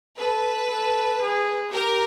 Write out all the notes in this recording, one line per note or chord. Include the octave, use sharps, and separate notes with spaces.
A4 B4
A4
G#4
G4 A#4